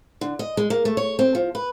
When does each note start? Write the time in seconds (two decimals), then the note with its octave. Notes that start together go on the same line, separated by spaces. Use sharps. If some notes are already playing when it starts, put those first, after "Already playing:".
0.21 D3
0.39 D#5
0.57 G#3
0.70 A#3
0.85 A3
0.97 C#5
1.19 C4
1.35 F3
1.55 B4